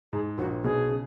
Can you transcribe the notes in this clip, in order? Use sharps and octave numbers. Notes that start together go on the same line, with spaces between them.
G#2 G#4
A#1 A#2 F#4
B1 B2 G#4
C#3